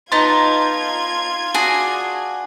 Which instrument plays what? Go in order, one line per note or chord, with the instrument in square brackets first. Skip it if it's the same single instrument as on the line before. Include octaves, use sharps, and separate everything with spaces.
[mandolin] B3 D#4 A5 [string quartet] F4 G#6 [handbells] C6
[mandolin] D4 F#4 [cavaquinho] G#4